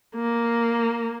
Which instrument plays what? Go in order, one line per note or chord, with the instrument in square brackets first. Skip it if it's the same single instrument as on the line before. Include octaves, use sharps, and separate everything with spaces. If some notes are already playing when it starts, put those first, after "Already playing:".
[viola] A#3